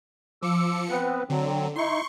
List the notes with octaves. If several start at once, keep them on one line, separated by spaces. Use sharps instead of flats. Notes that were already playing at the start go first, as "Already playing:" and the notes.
F3 D6 E6 C#7
B3 C4 B4
D3 F#3 C4
D#4 E4 C6 C#6